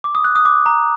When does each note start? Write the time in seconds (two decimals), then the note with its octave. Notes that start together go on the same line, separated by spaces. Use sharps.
0.04 D6
0.15 D#6
0.24 F#6
0.35 D#6
0.45 D6
0.66 A#5